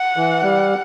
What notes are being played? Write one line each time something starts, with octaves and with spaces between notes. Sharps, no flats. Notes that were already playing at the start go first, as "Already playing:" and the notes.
Already playing: F#5
E3
G3